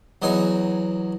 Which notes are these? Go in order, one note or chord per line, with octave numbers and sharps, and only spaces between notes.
E2 F#3 D#4 C#5 G#5